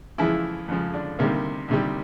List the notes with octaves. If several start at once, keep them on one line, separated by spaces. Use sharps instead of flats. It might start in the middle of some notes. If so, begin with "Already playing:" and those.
F2 C#3 E3 F3 G#3 E4
F2 C#3 F3 G#3
D3 D4
D2 C3 D#3 G3 A#3
D2 C3 D#3 G3